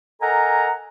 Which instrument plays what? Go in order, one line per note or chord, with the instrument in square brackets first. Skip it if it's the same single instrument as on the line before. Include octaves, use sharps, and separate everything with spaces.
[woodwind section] A4 A#4 D#5 F#5 G#5 A#5